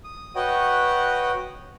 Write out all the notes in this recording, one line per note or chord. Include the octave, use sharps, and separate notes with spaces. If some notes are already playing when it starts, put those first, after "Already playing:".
D#6
F#4 B4 C#5 D#5 F#5 G5